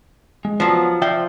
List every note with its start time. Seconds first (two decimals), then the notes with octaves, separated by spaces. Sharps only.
0.45 G#3
0.60 F3 F#3 B3
1.02 F3 D5 E5 G5